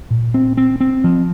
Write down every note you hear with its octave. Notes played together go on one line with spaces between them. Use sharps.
A#2
C4
C4
C4
F3